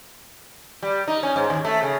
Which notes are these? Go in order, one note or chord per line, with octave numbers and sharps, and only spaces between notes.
G3
D#4
C#4
G#2
D#2
A3
C#3